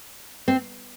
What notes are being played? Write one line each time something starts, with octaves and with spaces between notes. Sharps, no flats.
C4